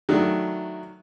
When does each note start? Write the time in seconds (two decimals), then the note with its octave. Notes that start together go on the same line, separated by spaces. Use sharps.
0.09 D#3 F#3 A3 D4 E4